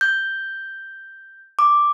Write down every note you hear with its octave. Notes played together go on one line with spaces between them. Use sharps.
G6
D6